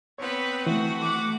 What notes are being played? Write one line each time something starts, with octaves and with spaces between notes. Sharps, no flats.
B3 C4 B4 C#5
E3 A3 F#4
F#5 D6